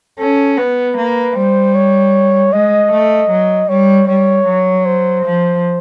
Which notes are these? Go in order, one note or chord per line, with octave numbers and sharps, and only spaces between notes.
C#4 A4
B3 B4
A#3
G3 C5
C#5
G#3 D#5
A3
F#3
G3 C#5
G3 C#5
F#3
C5
F3